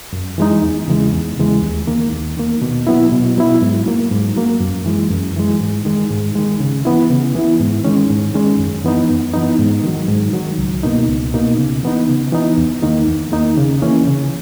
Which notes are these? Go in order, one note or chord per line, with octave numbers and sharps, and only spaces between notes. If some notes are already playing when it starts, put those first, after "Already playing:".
F#2
E3 G#3 D#4
E2
C#3 E3 G#3
E2
C#3 E3 G#3
D#2
D#3 A#3
D#2
D#3 A#3
B2
F#3 B3 E4
B2
F#3 B3 E4
G#2
F#3 A#3
G#2
F#3 A#3
F#2
E3 G#3
F#2
E3 G#3
G#2
D#3 G#3
G#2
D#3 G#3
C#3
E3 B3 E4
C#3
E3 B3 E4
G#2
D#3 G#3 C#4
G#2
D#3 G#3 C#4
F#2
E3 B3 D#4
F#2
E3 B3 D#4
G#2
D#3 F#3
G#2
D#3 F#3
C#2
B2 A#3 D#4
C#2
B2 A#3 D#4
C#3
E3 B3 D#4
C#3
E3 B3 D#4
E2
D#3 A#3 D#4
E2
D#3 A#3 D#4
C#3
E3 A#3 C#4
C#3